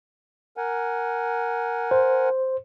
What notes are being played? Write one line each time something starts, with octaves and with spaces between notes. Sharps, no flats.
A#4 F#5 G#5
C5